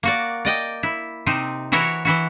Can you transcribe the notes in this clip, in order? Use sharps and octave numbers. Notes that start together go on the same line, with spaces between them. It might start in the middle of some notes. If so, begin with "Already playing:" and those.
A#3 F#4 D5
D5 D#5 G5
E4
C3 C4 D#4
E3 E4 F#4 A#4 C#5
E3 E4 F#4